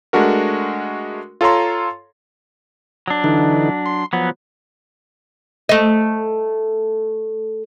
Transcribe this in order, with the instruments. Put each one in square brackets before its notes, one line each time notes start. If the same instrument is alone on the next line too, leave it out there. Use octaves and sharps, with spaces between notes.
[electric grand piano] G#3 A3 D4 F#4 A#4
F4 A4 C#5 A#5 C6
[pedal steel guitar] F#3 D4
[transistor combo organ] D3 E3 D#4
C6
[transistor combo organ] F3 [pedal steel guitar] F#3 B3
[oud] A3 D#5